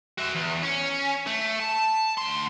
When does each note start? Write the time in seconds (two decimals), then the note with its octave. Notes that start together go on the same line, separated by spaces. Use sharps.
0.18 F#4 E5
0.35 E2
0.63 C#4
1.27 A3
1.60 A5
2.18 D2 C6